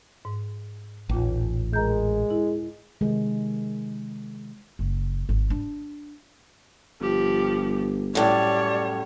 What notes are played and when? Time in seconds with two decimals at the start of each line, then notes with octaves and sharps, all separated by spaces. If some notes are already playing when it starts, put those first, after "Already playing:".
0.25 G#2
1.09 A1 D#2 A#2 F4
1.73 G#3 A#4 A#5 G6
2.31 E4
3.01 C3 D#3 G#3
4.79 F#1
5.29 G#1
5.50 D4
7.01 G1 F3 G4
8.15 F#2 A2 G3 C#5 D5